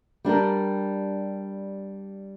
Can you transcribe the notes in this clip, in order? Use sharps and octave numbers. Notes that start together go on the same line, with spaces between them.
G3 D4 G4 A#4